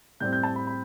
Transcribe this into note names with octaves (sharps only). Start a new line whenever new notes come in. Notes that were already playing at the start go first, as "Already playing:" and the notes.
A2 G3 C4 G6
G6
A5
B5
B5